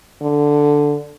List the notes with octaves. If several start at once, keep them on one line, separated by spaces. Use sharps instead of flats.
D3